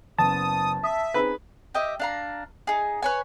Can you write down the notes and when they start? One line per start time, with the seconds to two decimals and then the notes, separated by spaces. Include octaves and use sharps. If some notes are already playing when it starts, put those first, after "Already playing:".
0.19 F#1 B3 A5 D#6
0.83 E5 D#6
1.14 C4 D#4 G#4 B4
1.74 G4 D#5 E5
2.00 D4 F5 A#5
2.67 D#4 G#4
3.02 B4 C#5 G#5